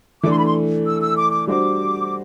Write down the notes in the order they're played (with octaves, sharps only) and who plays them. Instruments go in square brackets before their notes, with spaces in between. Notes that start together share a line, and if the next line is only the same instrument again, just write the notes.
[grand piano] E3 A3 D4 A4 [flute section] D6
[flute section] C6
B5
C6
E6
E6
D6
D6
[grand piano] G3 D4 F#4 C5 [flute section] D6